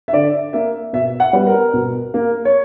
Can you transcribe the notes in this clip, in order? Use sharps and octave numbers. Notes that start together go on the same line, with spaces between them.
E5
D3 D5
A#3 E5
B2 E5
F#5
G3 B3
A#4
B2
A#3
C#5